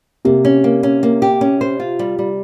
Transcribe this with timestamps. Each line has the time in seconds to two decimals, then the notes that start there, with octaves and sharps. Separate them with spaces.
0.25 C3 A#3
0.45 C#4
0.64 A#3
0.83 C#4
1.03 A#3
1.22 G4
1.41 C#4
1.61 C5
1.80 F4
1.99 G3
2.19 G3